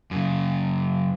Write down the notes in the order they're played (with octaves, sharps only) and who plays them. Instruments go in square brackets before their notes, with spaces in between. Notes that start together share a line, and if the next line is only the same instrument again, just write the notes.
[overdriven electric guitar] F#2 C#3